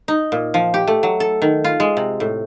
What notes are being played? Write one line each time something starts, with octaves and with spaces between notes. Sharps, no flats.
D#4
A#2
F3
G4
A3
F#3
A4
D#3
F4
G#3
C3
A2